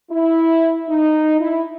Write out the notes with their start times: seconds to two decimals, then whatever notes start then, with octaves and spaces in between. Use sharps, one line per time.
0.11 E4
0.88 D#4
1.40 E4